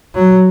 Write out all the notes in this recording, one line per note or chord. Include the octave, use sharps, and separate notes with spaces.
F#3